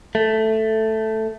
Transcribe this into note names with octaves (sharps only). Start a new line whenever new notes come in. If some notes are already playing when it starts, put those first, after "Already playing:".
A3